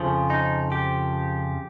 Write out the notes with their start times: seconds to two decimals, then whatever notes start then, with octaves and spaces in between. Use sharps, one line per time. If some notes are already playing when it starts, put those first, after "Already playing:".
Already playing: F2 C#3 F3
0.30 D#4
0.72 G4